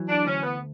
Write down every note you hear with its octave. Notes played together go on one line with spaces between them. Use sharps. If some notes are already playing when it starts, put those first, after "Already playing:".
Already playing: E3 F#3
D4
D2 C#4
B3